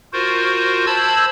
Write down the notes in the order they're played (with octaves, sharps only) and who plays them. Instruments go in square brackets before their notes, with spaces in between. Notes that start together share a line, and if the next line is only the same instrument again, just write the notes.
[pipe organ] F4 F#4 A#4 C5
C5 A5 B5 E6 G#6